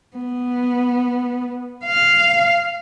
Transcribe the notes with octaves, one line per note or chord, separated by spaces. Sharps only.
B3
F5